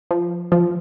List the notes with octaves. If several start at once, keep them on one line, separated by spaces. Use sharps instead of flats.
F3
F3